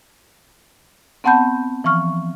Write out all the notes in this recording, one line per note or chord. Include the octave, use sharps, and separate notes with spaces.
B3 C4 F#5 A5 B5 G6
E3 F3 C#6 F6